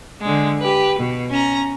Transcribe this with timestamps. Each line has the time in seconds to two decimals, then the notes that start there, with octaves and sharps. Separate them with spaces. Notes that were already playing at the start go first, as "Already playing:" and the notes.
0.21 D3 G#3
0.60 G4 B4
0.98 B2
1.29 C#4 A#5